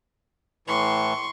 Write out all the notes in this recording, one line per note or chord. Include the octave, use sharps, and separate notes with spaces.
A2 E3 C6 C#6